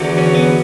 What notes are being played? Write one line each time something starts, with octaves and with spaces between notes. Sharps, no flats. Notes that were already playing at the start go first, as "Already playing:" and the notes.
Already playing: E2 D3 F#3
C#4
B3